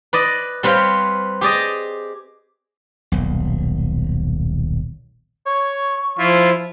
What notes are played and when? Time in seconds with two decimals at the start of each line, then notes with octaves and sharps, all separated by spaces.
0.13 B4 D5 D#5
0.63 G3 C4 B4 C#5 F5 G5
1.41 G4 G#4 D5 D#5
3.12 D#1 B1
5.46 C#5 C#6
6.19 F3 E4 F4